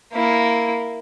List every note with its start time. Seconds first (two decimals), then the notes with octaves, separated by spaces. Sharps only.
0.13 A#3 E4